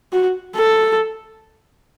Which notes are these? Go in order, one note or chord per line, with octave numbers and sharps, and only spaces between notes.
F#4
A4